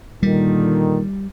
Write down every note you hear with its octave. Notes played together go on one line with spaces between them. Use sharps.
A#2 D3 D#3 G3